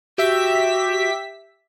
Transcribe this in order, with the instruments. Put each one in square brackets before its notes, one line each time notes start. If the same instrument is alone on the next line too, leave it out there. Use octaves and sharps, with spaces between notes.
[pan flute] F#4 [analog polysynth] G4 E5 B6